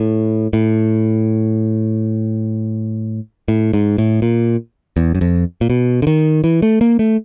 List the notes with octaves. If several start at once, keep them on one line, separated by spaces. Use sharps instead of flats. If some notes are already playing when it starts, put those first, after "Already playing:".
Already playing: A2
A2
A2
G#2
A2
A#2
E2
F#2
F2
A#2
B2
D3
D#3
E3
A3
A#3
A3